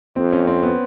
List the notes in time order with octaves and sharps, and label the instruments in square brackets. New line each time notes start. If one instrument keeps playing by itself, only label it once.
[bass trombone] F2 [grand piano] C4
[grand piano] C#4
C4
B3